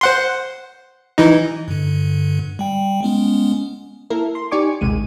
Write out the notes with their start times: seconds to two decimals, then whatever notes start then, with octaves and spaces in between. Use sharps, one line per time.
0.01 C5 F#5 C6
1.18 E3 D#4
1.68 G2 D3
2.59 G3 G5
3.03 G#3 B3 C#4
4.10 A#3 E4 A4 A#4
4.35 C6
4.51 D#4 G4 D5 G#5 C#6 D6
4.81 A#1 D#2 G#2 C3 G#3 D#7